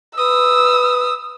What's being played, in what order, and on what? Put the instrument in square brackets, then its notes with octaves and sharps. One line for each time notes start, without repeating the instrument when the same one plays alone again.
[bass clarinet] B4 [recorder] D#6 [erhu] E6